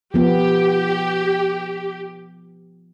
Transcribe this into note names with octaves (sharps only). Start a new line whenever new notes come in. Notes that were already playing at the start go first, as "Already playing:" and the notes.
F3 B3 G4